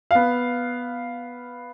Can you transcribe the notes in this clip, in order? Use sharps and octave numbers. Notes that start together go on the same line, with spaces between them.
B3 F5